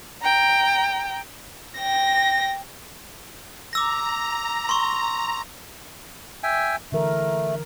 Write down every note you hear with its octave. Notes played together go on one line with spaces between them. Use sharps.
G5 A#5
G5 A#6
A#5 D6 E6 A#6
C6 C#6
E5 G5 G#5
D3 E3 A3 A#4